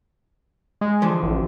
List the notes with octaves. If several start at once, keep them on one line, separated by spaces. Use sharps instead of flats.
G#3
D3 E3 F3
A1